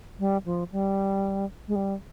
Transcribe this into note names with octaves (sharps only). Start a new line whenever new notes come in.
G3
F3
G3
G#3
G3